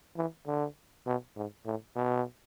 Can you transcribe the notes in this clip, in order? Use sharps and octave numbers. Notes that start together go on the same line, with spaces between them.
E3
D3
B2
G#2
A2
B2